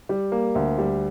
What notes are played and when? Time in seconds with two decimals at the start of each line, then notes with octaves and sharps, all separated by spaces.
0.09 G3
0.32 A#3
0.55 D2
0.78 G3